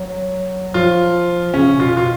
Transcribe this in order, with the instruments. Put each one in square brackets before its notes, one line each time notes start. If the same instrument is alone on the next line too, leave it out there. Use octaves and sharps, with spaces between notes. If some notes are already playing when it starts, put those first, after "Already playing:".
Already playing: [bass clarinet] F#3
[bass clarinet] F3 [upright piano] F4
[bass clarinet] C#3 [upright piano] C#4
[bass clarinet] B2
[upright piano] F4
[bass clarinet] B2 [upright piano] F4